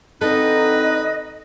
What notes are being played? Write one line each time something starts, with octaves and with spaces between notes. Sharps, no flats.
D3 C4 D#4 A4 B4 D#5